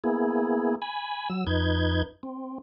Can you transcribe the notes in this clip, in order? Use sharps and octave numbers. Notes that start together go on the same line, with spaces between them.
A#3 B3 E4 G#4
G#5 B5
F#3 E6
F2 D#4 B4 G6 G#6
C4